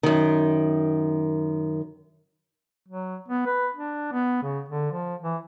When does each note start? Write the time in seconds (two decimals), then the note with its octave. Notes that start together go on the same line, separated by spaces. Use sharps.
0.03 F#2 D#3
2.88 F#3
3.28 B3
3.46 B4
3.74 D4
4.12 B3
4.43 C#3
4.69 D3
4.92 F3
5.22 E3